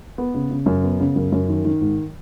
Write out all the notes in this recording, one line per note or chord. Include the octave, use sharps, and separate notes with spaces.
B3
C#3
C#3
F#2
B3
C#3
F#2
F#2
D#3
D#3
G#2